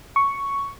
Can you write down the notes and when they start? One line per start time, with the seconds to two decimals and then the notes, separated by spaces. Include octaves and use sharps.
0.16 C#6